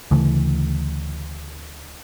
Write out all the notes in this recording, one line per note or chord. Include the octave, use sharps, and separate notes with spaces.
D2 C#3 E3 A3